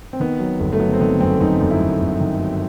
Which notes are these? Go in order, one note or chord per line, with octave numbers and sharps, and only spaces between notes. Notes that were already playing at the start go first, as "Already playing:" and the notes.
C4
D#3 B3
F#3
G1
A3
F#3 B3
C4
D#3 B3
F#2 C4
F#2 D#4
F#2
E4
F#2
G1
D#3
F#3